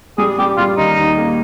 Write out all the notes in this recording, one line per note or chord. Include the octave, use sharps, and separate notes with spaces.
G3 G#4
G3 G4
G3 F4
D#2 D#4
D#2
A#3